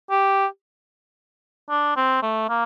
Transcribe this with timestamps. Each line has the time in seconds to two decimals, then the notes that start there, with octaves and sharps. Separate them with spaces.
0.11 G4
1.69 D4
1.97 C4
2.22 A3
2.49 A#3